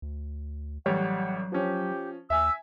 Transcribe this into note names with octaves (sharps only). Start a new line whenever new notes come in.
D2
A1 F#3 G3 C#5 F#5
F3 C#4 G4
D#2 E5 G#5 E6